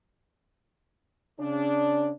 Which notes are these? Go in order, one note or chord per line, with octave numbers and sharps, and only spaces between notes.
C#3 D4